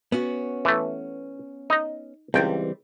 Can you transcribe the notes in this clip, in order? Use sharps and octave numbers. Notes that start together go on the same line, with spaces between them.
B3 C#4 F#4
E3 A3
D#4 D#5
C#2 E3 G3 C4 G5